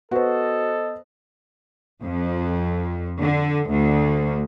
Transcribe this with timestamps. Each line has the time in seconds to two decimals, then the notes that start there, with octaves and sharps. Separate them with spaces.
0.11 B3 F#4 A4 C5 D#5
2.02 F2
3.21 D3
3.69 D2